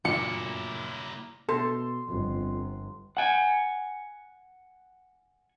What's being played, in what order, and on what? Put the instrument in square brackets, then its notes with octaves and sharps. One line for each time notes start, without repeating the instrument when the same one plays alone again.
[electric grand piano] F#2 A#2 [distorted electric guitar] A#3 E4 [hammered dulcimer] D6 [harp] C#7
[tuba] B2 [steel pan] A4 [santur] C6
[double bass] G1 [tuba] F2
[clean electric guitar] F#5 G#5